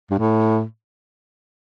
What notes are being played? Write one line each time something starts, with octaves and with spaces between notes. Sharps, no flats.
G2
A2